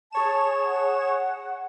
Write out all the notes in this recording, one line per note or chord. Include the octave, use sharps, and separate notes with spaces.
G#4 C#5 A5 E7
F#5